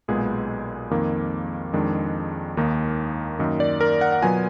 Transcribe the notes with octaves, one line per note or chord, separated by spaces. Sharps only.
B1 A#2 G#3 B3 G#4
F2 D#3 A#3
F2 D#3 G#3 D4
D#2 D#3 A#3 D#4
F#2 D#3 A#3 D#4
D5
A#4
F#5
F#5
B2 F#3 B3 F4 G#5